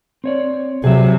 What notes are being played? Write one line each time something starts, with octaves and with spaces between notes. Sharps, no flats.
C4 C#5 D5
C3 F#3 G#4 E5